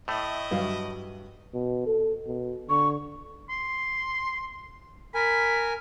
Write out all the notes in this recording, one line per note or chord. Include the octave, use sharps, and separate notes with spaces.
A2 A3 E4 D#5
G2 F#3 F5
B2
A4
B2
D3 C#6
C6
A#4 G#5 B5